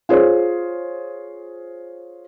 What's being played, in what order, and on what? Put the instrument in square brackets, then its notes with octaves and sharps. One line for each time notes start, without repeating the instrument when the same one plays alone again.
[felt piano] F4 G#4 C5 C#5